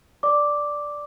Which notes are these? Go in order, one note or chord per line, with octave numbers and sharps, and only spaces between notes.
D5 D6